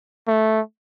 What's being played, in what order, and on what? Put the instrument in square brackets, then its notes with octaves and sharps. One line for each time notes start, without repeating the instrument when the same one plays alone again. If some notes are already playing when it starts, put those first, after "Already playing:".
[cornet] A3